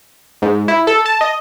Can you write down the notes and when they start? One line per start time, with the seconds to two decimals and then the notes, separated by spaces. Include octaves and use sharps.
0.42 G#2
0.68 E4
0.87 A4
1.06 A5
1.21 D#5